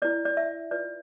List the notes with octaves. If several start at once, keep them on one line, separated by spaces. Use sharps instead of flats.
E4 B4 D5
D5
E5
F4 B4 D5